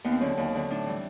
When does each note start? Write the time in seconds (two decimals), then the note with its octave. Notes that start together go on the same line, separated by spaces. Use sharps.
0.04 D#2 B3
0.12 C4
0.20 D3 F#3 C#4
0.37 D#2
0.54 D3 F#3
0.70 A2 D4
0.86 E3 G3